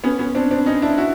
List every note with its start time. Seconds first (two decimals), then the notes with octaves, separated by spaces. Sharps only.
0.04 B3 C#4
0.19 B3 C#4
0.35 C4 D4
0.51 C4 D4
0.66 C#4 D#4
0.82 D4 E4
0.98 E4 F#4